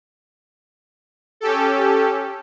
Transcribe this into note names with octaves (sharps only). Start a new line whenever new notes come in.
C#4 G4 A4